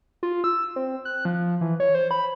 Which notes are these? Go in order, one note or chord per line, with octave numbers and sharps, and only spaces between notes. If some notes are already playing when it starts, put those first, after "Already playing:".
F4
E6
C4
F#6
F3
E3
C#5
C5
B5